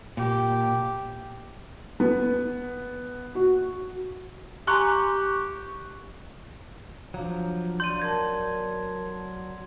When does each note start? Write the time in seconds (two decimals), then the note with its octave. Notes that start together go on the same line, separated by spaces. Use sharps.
0.17 A#2 G4
2.00 B3
3.35 F#4
4.67 G4 G#5 A#5 C6 C#6 F#6
7.14 F3 F#3 D4 F5 A#5
7.80 F#3 D5 C6 G6 D#7
8.02 A#4 A5 G#6